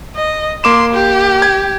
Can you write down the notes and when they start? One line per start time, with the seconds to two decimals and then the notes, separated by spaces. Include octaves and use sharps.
0.15 D#5
0.64 A#3 C6 D6 E7
0.93 G4
1.42 G#6